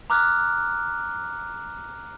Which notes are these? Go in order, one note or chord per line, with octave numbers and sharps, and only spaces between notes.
A#5 D6 F6 F#6